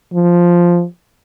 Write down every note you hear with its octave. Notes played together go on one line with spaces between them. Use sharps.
F3